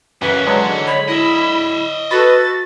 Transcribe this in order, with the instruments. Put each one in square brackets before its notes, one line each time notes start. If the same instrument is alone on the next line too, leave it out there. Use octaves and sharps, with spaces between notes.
[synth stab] F#2 C#3 B6 [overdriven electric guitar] E3 C#4 [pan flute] B4
[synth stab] D3 F#3 G#3
[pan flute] C#5 [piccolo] B5
[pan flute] E4 [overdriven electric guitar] D#5 E5
[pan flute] F#4 [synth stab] A4 B4 [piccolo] A6